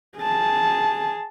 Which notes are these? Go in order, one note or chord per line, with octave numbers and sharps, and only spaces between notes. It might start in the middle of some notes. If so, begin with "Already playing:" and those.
G#4 A5